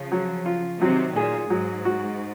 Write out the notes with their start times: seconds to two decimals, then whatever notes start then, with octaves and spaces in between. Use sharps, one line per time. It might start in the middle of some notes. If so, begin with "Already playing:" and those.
Already playing: C#3 F3
0.12 F#3
0.46 F4
0.80 C3 D#3 F#3
1.15 A#2 G#4
1.50 G#2 F#3
1.85 F#4